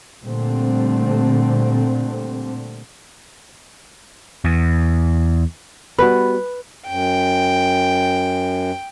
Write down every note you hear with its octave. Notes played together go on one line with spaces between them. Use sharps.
A#2 D3 G3 A3 C4
E2
G3 B3 F#4 B4
F#2 G5